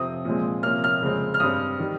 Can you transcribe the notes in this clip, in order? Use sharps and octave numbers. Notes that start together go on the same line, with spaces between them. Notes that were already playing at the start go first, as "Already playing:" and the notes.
Already playing: F2 C3 F3 C4 D#6
A#2 F3 G#3 C4
C3 F3 A#3 C#4 F6
F6
F2 C#3 G#3 C4
F6
G2 G3 C4 D#6
D#3 G3